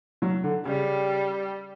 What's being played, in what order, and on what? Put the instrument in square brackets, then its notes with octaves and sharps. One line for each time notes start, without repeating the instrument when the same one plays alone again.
[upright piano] F#3
D3
[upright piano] C#3 [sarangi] G3